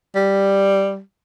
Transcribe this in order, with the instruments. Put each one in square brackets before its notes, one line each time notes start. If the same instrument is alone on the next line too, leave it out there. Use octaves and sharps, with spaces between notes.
[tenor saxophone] G3